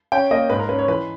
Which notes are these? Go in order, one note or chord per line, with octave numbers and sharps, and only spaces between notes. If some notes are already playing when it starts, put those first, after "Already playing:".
C#4 G5
A#3 D#5
G#2 B4
A#4
C#4 B4
C#5
E3 B4